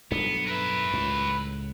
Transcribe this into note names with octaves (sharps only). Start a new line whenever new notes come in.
B1 G2 A3 B3
A#4 B4 E5
C#2 A2